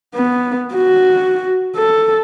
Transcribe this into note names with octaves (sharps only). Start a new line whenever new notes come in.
B3
F#4
A4